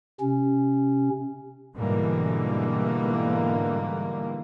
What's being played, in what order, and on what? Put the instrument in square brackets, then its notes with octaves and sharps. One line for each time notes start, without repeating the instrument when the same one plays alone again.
[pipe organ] C3 C#4
[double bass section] G#2 B2 D3 E3 G3 A#3